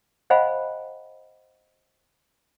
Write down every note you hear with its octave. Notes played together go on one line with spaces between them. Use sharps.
C5 D#5 F5 F#5 G#5 B5